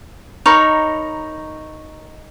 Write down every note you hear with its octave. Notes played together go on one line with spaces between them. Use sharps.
D#4 A#4 C#5 B5